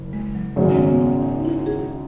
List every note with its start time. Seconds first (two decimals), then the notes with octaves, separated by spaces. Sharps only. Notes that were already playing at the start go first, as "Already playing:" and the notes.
Already playing: F#1
0.13 G#3
0.35 F#3
0.56 G#1 F#2 C#3 F#3 A3
0.79 B3
0.90 B3
1.01 C#4
1.22 D#4
1.40 D#4
1.45 E4
1.66 G#4